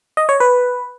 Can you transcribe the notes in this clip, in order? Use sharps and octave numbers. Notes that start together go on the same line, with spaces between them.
D#5
C#5
B4